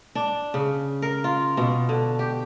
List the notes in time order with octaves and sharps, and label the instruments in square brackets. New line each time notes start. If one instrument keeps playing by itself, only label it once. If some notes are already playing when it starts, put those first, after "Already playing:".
[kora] D4
C#3
A#4
F4
B2
D3
G4